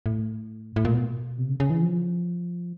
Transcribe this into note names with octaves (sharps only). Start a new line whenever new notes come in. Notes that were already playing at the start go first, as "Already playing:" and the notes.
A2
A2
A#2
B2
C3
C#3
C#3
E3
F3